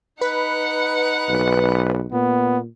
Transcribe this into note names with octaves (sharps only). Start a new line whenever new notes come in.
D#4 B4 F#5
B1
A#2 B3